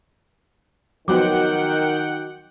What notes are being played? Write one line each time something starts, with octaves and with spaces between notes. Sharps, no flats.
D#3 F3 F#3 B3 F#4 F#5 G5 D6